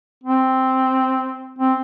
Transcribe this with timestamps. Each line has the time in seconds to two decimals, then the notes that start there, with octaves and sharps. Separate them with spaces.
0.23 C4
1.59 C4